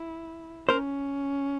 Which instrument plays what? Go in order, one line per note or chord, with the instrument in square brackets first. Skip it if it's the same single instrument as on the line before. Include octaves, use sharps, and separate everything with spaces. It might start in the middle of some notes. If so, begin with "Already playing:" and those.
Already playing: [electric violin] E4
[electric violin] C#4 [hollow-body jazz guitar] A#4 C5